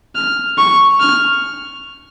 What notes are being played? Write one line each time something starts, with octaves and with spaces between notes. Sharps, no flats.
F6
C#6
F6